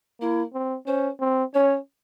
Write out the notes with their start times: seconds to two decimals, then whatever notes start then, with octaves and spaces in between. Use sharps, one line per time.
0.21 A#3 E4
0.54 C4
0.87 C#4 C5
1.21 C4
1.54 C#4 C#5